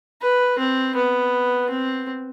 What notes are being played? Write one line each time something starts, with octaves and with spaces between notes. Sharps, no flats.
B4
C4
B3
C4